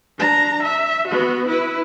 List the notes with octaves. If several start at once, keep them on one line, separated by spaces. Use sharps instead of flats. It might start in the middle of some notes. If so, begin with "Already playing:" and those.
D4 A#5
E5
B3 F#4
E4 B4